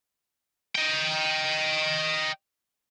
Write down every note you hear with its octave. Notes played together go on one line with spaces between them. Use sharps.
D#5 G5